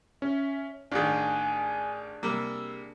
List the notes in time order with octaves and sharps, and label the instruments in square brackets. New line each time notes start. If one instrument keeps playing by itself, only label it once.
[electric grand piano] C#4 [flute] E5
[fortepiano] A1 D#3 [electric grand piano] D4 G#4 [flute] G#5
[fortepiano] C3 G3 A#3 [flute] E6